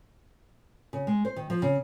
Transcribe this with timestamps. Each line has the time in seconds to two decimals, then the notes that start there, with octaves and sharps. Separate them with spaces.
0.93 C#3
1.07 G#3
1.25 C5
1.36 D#3
1.50 F3
1.62 C#3